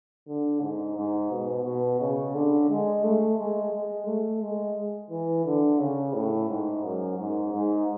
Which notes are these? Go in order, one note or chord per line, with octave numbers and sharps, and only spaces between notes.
D3
G#2
G#2
B2
B2
C#3
D3
G#3
A3
G#3
G#3
A3
G#3
E3
D3
C#3
A2
G#2
F#2
G#2
G#2